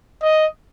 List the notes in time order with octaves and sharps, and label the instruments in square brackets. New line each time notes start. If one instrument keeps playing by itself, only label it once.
[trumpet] D#5